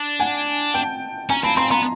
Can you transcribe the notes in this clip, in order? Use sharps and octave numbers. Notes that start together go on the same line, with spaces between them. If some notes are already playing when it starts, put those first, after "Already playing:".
Already playing: D4
F#5 G#5
G5 A5
C#4 G#5 A#5
C4 A5 B5
C4 A#5 C6
B3 A#5 C6